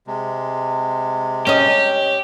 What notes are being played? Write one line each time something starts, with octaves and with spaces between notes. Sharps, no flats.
C3 G#3
C#4 G4 D#5